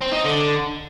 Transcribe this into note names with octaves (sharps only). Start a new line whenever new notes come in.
C4
D#4
D3